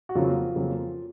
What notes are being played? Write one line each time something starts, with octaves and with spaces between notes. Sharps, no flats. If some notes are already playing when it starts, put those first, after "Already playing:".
F#4
F2 C#3 F#3 A#3 F4
F2 C#3 F#3 A#3